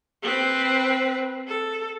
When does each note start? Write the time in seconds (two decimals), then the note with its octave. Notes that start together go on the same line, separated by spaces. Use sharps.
0.23 C4 B4
1.48 A4